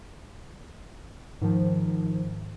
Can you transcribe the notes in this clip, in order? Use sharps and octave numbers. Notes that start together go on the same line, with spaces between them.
G#2 D#3 F3